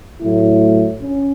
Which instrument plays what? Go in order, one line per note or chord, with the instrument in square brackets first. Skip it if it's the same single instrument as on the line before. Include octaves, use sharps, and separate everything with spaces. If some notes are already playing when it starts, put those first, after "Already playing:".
[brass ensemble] A2 F#3 A3 E4
C#4